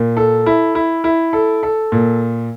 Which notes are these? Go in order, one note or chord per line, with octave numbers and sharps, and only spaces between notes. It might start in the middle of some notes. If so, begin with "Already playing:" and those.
Already playing: A#2
A4
E4
E4
E4
A4
A4
A#2